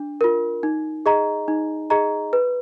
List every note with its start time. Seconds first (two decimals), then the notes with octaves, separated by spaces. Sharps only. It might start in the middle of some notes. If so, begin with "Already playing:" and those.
Already playing: D4
0.21 F4 A#4
0.63 D#4
1.06 G#4 D#5 A#5
1.48 D#4
1.90 G#4 D#5 A#5
2.33 B4